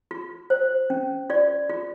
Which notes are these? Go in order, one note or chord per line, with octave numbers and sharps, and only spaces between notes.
F4
C5
C#4
F4 D5
F4